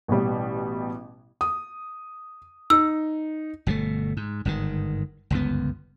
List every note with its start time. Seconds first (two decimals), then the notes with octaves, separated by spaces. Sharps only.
0.08 A1 B2 G3
1.41 D#6
2.70 D#4 E6
3.67 G1 B2 D3 A3
4.17 G#2
4.45 G1 G#2 D3 D#3
5.30 G1 C#2 F#2 B3